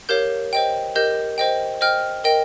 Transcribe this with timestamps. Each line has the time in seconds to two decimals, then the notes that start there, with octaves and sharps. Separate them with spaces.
0.09 G4 A#4 C#5 F5 G6
0.53 C5 D#5 G5
0.95 G4 A#4 D#5 G6
1.38 C5 D#5 G5
1.81 C5 D#5 G5 F6
2.24 A#4 D#5 G5